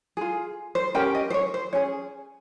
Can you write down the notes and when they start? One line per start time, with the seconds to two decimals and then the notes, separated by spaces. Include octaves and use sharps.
0.17 F4 G#4
0.75 C5
0.95 C#4 G4 A#4 G5
1.15 D#5
1.30 C5
1.34 C#5
1.54 C5
1.73 C#4 G#4 C#5